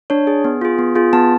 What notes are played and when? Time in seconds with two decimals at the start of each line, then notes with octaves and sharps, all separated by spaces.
0.10 D4 C#5
0.27 G#4
0.45 B3
0.61 F4 G#4
0.79 B3
0.95 F4 G#4
1.13 B3 A5